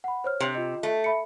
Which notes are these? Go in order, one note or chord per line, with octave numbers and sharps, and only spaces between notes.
F#5 B5
C5 C#5 F6
C3
F4 D#5
A3
E5 B5 C#7